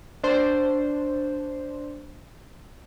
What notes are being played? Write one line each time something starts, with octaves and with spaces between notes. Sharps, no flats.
D4 C5